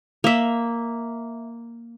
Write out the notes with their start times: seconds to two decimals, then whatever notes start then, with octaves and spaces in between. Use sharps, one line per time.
0.24 A#3 E5